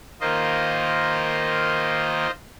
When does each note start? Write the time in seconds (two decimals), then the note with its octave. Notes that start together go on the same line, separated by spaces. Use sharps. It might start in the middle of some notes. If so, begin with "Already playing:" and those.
0.20 D#3 A#3 F4 C5 D#5